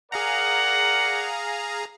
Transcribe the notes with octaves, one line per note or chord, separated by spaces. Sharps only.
G#4 A#4 D5 F5 F#5 A#5